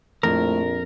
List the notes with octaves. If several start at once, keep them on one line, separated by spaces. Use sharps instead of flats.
A#1 F2 A2 A#4